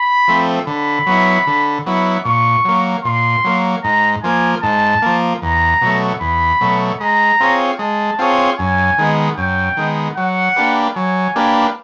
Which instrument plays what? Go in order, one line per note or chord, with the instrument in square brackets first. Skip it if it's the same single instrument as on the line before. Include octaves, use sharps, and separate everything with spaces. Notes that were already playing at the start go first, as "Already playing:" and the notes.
Already playing: [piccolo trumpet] B5
[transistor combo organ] F3 A3 C4
[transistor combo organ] D3 [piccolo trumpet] B5
[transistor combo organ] F#3 B3 E4
D3
F#3 B3 E4
[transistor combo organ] A#2 [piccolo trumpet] C#6
[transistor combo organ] F#3 A#3
[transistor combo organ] A#2 [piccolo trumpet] C6
[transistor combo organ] F#3 A#3
[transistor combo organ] G#2 [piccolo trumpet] A#5
[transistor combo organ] F3 A#3 [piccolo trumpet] G#5
[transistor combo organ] G#2 [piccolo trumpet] A5
[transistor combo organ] F3 A#3
[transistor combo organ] E2 [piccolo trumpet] A#5
[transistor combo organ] B2 F#3 A3
[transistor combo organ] E2 [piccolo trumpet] B5
[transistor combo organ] B2 F#3 A3
[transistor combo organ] G#3 [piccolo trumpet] A#5
[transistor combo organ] C4 F4 G#4 C#5
[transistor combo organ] G#3 [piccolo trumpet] A5
[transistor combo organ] C4 F4 G#4 C#5
[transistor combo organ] F#2 [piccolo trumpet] G#5
[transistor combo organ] D#3 G#3 B3
[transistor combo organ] F#2 [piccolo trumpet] G5
[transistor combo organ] D#3 G#3 B3
[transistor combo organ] F#3 [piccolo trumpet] F#5
[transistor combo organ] A#3 D4 G4 B4
[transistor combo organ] F#3 [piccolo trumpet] G#5
[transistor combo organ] A#3 D4 G4 B4